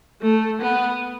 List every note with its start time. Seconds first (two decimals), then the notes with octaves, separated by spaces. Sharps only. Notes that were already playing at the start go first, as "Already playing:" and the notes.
0.22 A3
0.62 B3